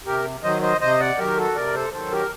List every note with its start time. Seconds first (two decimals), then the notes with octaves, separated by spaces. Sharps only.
0.06 C3 G4 A#4
0.43 D#3 F#3 C5 D#5
0.62 C5 D#5
0.81 C3 C5 D#5
1.00 D5 F#5
1.18 D#3 F#3 G4 A#4
1.37 F#4 A4
1.55 C3 A#4 D5
1.75 A4 C5
1.93 D#3 F#3 A4 C5
2.12 G4 A#4